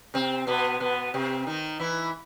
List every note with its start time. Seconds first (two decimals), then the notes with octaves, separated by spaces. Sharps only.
0.14 C3 C4
0.47 B2 B3
0.80 B2 B3
1.14 C3 C4
1.47 D#3 D#4
1.79 E3 E4